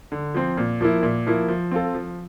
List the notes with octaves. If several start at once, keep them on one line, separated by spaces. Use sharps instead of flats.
D3
F3 C4
A#2
F3 A#3 E4
A#2
F3 A#3 E4
F3
C4 F4 A4
F3